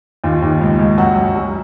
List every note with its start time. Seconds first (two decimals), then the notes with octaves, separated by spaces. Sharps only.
0.24 D#2 F4
0.42 D#2
0.61 C#2
0.79 C#2
0.98 F#2 F#4
1.16 F#2
1.36 F#2